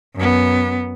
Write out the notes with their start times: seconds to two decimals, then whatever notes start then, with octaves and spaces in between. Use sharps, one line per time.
0.16 F#2 B3